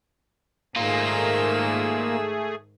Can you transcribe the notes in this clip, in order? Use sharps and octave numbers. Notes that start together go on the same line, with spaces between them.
G#2 D#3 A3 A#3 F4 G#4 E6